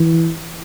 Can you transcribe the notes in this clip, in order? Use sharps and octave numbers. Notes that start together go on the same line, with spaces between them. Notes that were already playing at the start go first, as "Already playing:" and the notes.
Already playing: E3